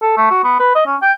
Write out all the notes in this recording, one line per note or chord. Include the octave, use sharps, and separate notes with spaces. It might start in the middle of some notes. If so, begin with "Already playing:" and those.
A4
A3
F#4
B3
B4
D#5
C#4
G5